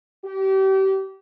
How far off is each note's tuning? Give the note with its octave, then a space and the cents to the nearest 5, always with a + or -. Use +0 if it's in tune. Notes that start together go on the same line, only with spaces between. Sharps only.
G4 -30